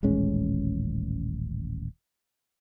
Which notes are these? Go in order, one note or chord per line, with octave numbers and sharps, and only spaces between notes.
D#1 A1 G#3 C#4